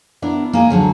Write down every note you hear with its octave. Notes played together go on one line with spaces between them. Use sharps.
B3 D4 E4 A#4
A#3 D#4 G#4
D2 D3 D#3 F#3